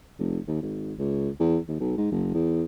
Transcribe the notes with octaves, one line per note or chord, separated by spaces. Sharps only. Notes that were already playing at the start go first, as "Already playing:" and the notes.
F1
D#2
G#1
C#2
E2
D#2
B1
G#2
F#1
E2